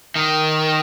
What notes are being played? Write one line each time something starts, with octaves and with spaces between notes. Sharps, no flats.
D#3